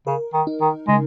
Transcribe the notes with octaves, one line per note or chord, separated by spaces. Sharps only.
C#3 A#4
D#3
D#4
D#3
C#3 G#3